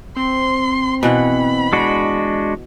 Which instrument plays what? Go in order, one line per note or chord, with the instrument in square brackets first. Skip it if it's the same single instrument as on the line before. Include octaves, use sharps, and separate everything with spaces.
[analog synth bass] C4 [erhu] C6
[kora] B2 E3 F#5 [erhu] B5
[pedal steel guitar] G#3 D4 F#4